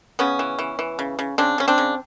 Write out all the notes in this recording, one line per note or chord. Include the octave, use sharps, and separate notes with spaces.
C#3 B3 C#4
E3
E3
E3
C#3
C#3
C#3 C4 D4
C#3 C#4
C4 D4
C#3